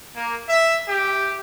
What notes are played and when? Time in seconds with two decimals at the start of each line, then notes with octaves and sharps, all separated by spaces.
0.15 A#3
0.47 E5
0.88 G4